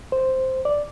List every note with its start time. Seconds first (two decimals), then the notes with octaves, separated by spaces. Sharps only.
0.12 C5
0.65 D5